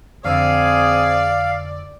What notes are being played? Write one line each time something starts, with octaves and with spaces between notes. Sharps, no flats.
F2 D3 C4 G#4 D5 F5 E6